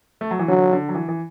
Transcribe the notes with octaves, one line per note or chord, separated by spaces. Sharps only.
A3
F#3
E3
D3 F#3
D3
F#3
E3
E3